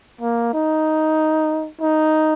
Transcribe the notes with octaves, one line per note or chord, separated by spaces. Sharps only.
A#3
D#4
D#4